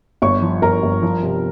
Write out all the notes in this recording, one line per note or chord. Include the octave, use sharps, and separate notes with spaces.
G1 C#5 C#6
F3
G1 A#4 A#5
G1
F3
C3